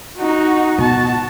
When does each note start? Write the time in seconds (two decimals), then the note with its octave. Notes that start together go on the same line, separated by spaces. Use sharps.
0.17 D#4 F#4
0.78 B2 F#4 A5